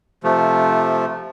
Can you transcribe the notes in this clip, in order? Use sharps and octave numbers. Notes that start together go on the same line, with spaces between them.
C3 F3 A3